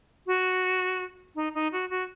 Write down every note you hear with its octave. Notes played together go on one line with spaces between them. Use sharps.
F#4
D#4
D#4
F#4
F#4